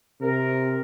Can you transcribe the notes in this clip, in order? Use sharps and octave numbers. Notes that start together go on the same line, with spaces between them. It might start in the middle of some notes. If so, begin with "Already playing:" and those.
C3 A#4